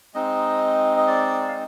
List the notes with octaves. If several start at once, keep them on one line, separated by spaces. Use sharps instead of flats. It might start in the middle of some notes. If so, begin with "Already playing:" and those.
G#3 C4 D#4 D#5
D#5
D5
F5